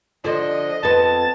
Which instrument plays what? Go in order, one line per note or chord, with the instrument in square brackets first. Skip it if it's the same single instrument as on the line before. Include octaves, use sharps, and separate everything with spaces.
[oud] D3 F3 [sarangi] D#5
[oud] F2 B3 [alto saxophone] A5